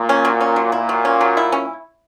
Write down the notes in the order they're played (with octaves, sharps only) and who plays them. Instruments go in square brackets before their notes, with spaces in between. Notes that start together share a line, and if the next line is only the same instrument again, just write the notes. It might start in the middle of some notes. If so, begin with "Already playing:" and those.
Already playing: [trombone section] A#2
[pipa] C#4
F#3
C#4
F#3
[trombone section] A#2 [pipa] E4
[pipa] F#3
C#4
F#3
E4
C#4